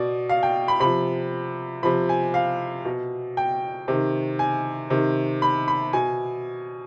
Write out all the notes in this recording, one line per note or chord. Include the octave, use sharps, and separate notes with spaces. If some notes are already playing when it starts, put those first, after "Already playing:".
Already playing: B2 D5
F5
G5
B5
C3 F3 B5
C3 F3 B5
G#5
F5
B2
G5
C3 D#3
G#5
C3 D#3
B5
B5
B2 G#5